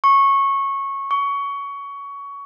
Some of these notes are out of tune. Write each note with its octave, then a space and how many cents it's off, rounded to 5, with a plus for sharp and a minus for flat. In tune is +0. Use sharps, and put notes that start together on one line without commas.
C#6 -15
C#6 +20